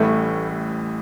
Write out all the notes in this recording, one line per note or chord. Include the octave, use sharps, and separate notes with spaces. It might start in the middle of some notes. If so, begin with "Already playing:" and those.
Already playing: A1 A2 E3 G3 A3